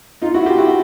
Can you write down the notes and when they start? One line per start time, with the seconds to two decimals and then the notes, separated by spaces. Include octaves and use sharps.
0.22 D#4 F4
0.34 E4 F#4
0.46 F4 G4
0.58 E4 F#4